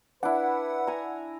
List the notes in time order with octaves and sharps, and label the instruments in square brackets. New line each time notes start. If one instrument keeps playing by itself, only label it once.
[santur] D4 E4 [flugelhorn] B4 [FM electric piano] F#5
[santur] G#5 A#5